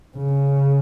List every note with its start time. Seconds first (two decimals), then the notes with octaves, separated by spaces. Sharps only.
0.17 C#3